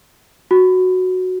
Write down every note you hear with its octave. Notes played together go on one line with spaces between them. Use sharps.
F#4